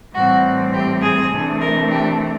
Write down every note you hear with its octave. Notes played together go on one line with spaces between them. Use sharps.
A2 E3 G3 C4 F#4
G4
G#4
C3 E3 A3 D4
A#4
G4